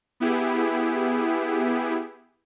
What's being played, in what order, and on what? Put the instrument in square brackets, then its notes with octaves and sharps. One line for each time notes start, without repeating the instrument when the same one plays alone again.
[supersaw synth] B3 E4 G4 G#4